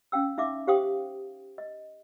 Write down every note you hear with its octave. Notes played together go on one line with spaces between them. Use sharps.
C#4 F5 G5 E6
D#4 E5 F5 D6
G4 C5 F5 G5 C6 D#6
D#5